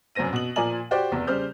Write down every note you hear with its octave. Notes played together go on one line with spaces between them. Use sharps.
F1 F#2 C#4 C5 A#6 D#7
B2 F#7
A#2 F3 A#4 D5 G#5 F#7
F#4 G4 C5 D5 G5
F1 E2
C#3 G3 C5 F6 G6